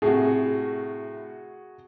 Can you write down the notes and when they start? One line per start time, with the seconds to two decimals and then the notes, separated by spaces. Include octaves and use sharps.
0.02 A2 C3 F#4 G#4